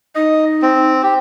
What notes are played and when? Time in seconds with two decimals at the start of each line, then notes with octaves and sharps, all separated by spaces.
0.15 D#4 D#5
0.62 C4
1.03 G4